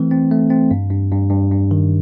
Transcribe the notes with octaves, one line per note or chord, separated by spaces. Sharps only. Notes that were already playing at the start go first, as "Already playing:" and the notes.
Already playing: E3 A3 C4
C4
A3
C4
G2
G2
G2
G2
G2
D#3